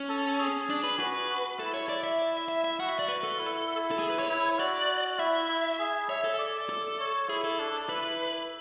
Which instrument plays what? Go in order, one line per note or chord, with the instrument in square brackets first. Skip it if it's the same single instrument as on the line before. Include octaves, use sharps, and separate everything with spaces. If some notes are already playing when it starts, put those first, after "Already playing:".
Already playing: [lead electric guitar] C#4
[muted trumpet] A4
G#4
[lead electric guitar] D4
B4
[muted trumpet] F#4 [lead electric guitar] B4
[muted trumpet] F#4
[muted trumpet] E4 [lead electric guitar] A4
[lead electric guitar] C#5
D5
E5
E5
E5
[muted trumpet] F#4 [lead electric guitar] F#5
[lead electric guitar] E5
D5
B4
A4
[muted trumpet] E4
[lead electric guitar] A4
G#4
B4
C#5
[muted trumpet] E4
[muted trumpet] F#4 [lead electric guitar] D5
[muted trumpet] E4 [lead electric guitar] E5
[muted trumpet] E4
G#4
[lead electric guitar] C#5 [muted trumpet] E5
[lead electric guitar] A4
[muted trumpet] D5
[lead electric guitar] A4
[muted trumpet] C#5
[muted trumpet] E4 [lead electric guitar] G#4
[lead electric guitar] A4
[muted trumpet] D4
[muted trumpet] E4 [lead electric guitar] B4